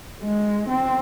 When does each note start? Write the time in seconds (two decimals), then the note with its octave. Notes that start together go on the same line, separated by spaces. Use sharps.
0.23 G#3
0.68 C4